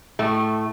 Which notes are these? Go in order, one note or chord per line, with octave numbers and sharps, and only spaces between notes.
A2 A3